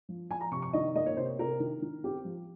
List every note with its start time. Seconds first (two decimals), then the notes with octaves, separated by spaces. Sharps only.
0.09 F3
0.30 F3 G#5
0.41 A#5
0.51 C3 C#6
0.62 C#6
0.73 D#3 D#5
0.95 A#3 D#5
1.06 C#5
1.17 C3 C5
1.39 C3 A#4
1.60 D#3
1.82 D#3
2.04 C4 G4
2.25 F3